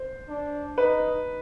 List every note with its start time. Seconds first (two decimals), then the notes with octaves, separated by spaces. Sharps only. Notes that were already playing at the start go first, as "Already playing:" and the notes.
Already playing: C5
0.29 D4
0.77 D#4 B4